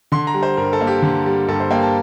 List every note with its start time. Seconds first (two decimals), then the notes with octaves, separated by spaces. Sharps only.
0.12 D3 C6
0.27 A#5
0.34 G3
0.43 C5
0.57 G2 A#4
0.73 A4
0.81 A#3
0.87 G4
1.02 D3
1.26 G3
1.48 G2 A4
1.60 C5
1.71 A#3 G5
1.83 A5